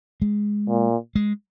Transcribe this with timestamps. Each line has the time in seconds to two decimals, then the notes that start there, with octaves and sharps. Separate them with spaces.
0.22 G#3
0.69 A#2
1.16 G#3